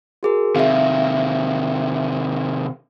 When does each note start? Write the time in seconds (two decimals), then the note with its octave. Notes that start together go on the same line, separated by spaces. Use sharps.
0.23 F#4 G#4 A#4
0.56 C3 D#3 E5 F5